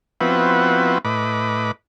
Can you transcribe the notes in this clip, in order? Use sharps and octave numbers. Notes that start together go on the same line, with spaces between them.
F3 B3 C4 E4 F#4 B4
A2 B4 D#5 B5 D6